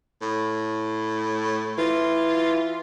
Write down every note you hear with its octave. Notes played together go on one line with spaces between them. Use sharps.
A2
E3 F4